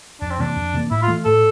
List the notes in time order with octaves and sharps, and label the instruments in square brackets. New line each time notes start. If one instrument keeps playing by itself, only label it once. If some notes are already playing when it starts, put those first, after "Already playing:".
[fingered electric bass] F2 [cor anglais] D4
[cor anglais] C4
[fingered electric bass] C3 E3 A#3 [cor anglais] D4
[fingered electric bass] F2
C3 E3 A#3
[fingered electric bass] A2 [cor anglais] E4
[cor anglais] F4
[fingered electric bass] E3 A3
[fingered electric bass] A2 [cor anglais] A4